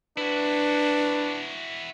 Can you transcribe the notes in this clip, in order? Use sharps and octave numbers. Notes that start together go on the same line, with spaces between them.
D4 E4 F#4 B4